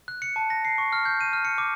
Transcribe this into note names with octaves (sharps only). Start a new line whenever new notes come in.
F#6
C#7
A5
A#6
C7
C#6
F6
G6
D#7
F6
C#7
D6